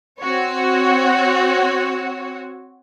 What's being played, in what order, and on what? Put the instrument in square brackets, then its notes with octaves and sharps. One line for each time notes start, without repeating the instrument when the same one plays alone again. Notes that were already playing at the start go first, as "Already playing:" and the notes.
[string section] C4 F#4 C#5